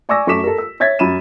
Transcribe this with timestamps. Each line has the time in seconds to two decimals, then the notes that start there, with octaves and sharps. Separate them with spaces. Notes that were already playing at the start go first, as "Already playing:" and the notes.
0.09 D5 G#5 C#6 D6 E6 A#6
0.27 F#2 A3 C#6 D6 B6 E7
0.44 A4 A#4
0.58 E6
0.80 C#5 E5 G#6 A6 B6
0.99 F#2 B5 D#7 E7